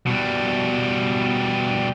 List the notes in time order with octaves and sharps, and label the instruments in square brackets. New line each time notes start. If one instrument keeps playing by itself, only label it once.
[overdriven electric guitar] B2 G3